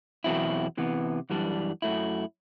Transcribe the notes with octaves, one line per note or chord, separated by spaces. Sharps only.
E2 B2 F#3 C4 E4
C3 E3 B3
F#2 E3 G3 D4
F#2 F#3 A3 E4